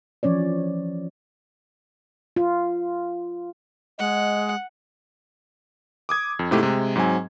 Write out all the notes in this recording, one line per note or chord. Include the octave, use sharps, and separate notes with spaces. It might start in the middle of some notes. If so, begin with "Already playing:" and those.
E3 F3 C#4 C#5 D5
F4
G#3 D#5 F#5
D6 D#6 G#6
F2
G#2 C3 A3 E4 G4
C3 G#3
G#2 F#3 C4 G#5